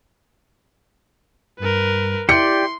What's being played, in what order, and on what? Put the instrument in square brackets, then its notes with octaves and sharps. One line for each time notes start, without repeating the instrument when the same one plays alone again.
[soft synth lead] G2 [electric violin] A#4 B4
[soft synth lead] E4 [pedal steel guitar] G4 D5 G5 [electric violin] C6 [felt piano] C#7